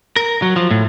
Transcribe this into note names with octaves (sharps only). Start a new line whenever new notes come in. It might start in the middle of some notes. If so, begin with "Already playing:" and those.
A#4
F#3
F3
A2